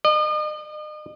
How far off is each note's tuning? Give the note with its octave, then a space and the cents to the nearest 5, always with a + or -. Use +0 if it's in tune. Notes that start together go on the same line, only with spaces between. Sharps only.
D#5 -40